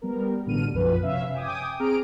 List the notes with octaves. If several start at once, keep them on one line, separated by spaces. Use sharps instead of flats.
G3 B3 A#4
A1 B2 D3 F6 D#7
B1 F#2 F3 B4
C3 C#4 E5 F5
G5 G#5 D6 D#6
C4 G#4 A#5 D6 F6 D7